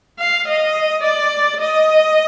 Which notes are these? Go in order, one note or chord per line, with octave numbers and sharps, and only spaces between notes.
F5
D#5
D5
D#5